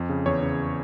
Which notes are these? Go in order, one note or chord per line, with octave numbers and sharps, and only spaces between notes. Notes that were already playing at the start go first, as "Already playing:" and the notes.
Already playing: F2
C#3
E2 C#5
C#3